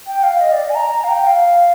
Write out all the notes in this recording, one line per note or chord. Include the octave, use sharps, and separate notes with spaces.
G5
F5
D#5
D5
D#5
G#5
A#5
F5
G5
F5